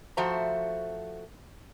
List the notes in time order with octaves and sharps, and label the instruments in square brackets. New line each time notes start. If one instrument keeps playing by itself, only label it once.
[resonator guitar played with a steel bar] F3 A3 F#4 C5 E5 A#5